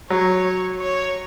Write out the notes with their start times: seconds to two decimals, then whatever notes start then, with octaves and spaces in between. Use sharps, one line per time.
0.10 F#3 C#5
0.81 C#5